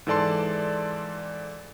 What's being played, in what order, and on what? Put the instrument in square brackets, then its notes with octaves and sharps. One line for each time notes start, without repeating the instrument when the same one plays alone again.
[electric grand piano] G#2 E3 A4 D5 A5 C6